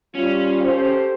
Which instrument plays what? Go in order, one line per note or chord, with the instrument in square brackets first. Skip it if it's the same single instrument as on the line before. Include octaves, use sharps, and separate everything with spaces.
[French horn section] G3 F4 [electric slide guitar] C#4
[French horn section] G4 A4 C5